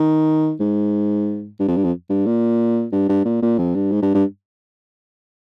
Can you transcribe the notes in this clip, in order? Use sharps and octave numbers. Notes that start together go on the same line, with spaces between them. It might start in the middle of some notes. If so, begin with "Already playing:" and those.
Already playing: D#3
G#2
G2
F2
G2
F2
G2
A#2
G2
G2
A#2
A#2
F2
G2
G#2
G2
G2